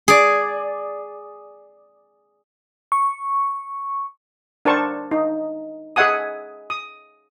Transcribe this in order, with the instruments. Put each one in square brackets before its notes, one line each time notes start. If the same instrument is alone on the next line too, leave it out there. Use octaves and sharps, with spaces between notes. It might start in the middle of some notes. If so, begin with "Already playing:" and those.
[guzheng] G#4 D5
[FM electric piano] C#6
[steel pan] D4 A#4 C5 A5 C#6
D#4
G#4 D#5 E5 F#5 G#5 D#6
D#6